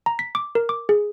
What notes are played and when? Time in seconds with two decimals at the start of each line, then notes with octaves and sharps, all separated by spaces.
0.06 A#5
0.19 B6
0.35 D6
0.55 A#4
0.69 D6
0.89 G#4